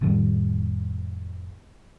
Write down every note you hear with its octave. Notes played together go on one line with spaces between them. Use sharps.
F1 A2 D#3 G3